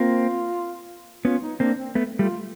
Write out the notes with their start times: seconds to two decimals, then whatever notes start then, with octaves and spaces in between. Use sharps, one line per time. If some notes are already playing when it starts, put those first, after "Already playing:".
Already playing: A#3 C4 F4
1.25 B3 C#4 F4
1.42 D#4
1.60 A#3 C4 D4
1.79 C4
1.95 A3 B3
2.19 G3 A3 F4